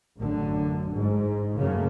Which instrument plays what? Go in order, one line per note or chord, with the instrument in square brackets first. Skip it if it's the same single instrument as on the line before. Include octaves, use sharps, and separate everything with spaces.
[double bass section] A1 F#2 D3
G#2
F#2 C#3 A3 A#3